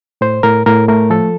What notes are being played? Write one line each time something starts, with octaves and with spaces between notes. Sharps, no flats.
A2 C5
A2 A#4
A2 A#4
A3 A#4
F3 A4